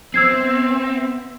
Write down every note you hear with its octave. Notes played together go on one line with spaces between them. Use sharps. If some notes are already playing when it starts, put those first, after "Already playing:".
B3 C4 E5 E6 G#6 C7